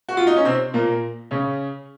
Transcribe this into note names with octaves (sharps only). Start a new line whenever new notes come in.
F#4
F4
D#4
C#4
C3 C4
A#2 A#3
C#3 C#4